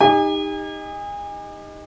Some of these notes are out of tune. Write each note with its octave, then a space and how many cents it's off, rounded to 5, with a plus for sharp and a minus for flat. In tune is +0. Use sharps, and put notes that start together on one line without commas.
D#4 +0 G4 +30 G#5 -35